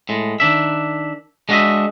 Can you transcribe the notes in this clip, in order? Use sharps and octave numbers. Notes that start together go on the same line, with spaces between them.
A2 G#3
D#3 D4 E5
G#3 D4 F#4 A4 D#5 E5